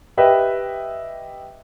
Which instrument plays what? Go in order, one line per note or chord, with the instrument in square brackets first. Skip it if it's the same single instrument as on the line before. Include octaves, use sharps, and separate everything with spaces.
[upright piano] G4 B4 D#5 E5 G5